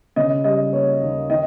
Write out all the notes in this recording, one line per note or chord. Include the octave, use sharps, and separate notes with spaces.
C#3 D#5
G3 D#5
A#3 C#5
D#2
D#3 D#5